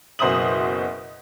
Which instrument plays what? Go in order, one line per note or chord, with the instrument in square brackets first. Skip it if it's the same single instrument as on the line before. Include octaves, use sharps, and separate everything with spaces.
[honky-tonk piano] F#1 B2 C5 E5 D#6 F#7